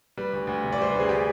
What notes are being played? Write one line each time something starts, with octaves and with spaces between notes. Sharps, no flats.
G3 B4
D2
D2
C3
D5
G3 C5
D2 B4
G#4
G4